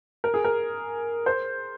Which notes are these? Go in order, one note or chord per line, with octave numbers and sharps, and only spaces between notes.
A#4
G#4
A#4
C5